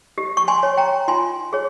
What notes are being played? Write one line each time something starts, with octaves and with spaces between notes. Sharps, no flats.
G4
C#6
G#5 C6
C#5
G5 A#5
F4 G#5 C6
G#4 C#5